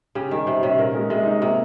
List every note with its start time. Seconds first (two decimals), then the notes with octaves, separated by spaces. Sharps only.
0.15 C#3 G4
0.31 D#3 G3
0.47 C3 C5
0.63 C3 C#4
0.79 A#2 A#4
0.95 G#3
1.10 C3 G#3
1.26 D#4
1.41 C3 A#3